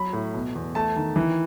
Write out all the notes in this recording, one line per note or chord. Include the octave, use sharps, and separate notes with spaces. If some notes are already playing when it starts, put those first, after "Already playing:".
Already playing: F#3 B5
A2
B2
E2
A3 A5
D#3
E3